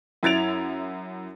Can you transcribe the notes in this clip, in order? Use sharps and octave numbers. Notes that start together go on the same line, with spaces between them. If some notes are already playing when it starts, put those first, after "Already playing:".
F#2 E4 G#6 A6 D7 F7